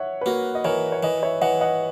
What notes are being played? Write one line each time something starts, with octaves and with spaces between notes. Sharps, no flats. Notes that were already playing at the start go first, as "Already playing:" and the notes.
Already playing: C#5 E5 F#5
B4
A#3 F#4 A#4
D#5
E3 A#4 C#5
C#5
E3 B4 D#5
C#5 E5
E3 D#5 F#5
D#5 F#5